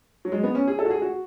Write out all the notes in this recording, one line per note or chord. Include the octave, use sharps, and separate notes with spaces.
F#3
G#3
B3
C#4
G#4
A4
F#4
G#4
F#4